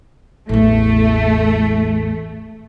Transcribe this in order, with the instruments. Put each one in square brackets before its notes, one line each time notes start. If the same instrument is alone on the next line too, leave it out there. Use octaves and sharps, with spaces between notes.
[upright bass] A1 E2 [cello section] A3